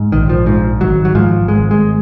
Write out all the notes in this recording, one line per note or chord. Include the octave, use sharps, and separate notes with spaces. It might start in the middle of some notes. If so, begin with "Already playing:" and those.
Already playing: G#2
A#1 D#3
F3
G#2 F3
G#1 F#3
F#3
G#2 F3
G#1 G#3
G#3